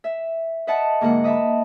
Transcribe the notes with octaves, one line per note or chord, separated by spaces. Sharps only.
E5
B4 D#5 E5 F#5 A5
G#2 D3 A#3 F4 A#4 F#5
D#5 E5 A5 B5